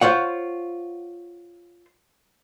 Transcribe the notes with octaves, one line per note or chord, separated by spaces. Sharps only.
F4 C5 C#5 F#5